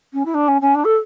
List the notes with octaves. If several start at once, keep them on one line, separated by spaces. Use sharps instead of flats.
C#4
E4
D4
C#4
C#4
D4
A4